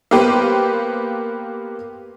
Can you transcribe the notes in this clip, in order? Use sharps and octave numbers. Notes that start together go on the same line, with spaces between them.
A#3 B3 G4 B4 C5